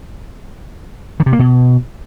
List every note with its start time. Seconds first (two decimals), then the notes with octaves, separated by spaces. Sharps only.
1.20 D#3
1.26 C3
1.33 A#3
1.39 B2